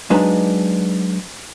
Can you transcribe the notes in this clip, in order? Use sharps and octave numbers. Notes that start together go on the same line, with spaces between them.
F#3 G#3 D4 D#4 B4 A#5